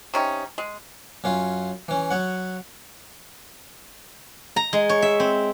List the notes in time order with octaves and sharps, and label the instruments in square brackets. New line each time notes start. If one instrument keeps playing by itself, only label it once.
[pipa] C3 C#4 D#4
G#3
[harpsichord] F#2 C#4 F4
E3 C#4
F#3 C#5 F#5
[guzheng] A#5
G#3
C#5
E5
C4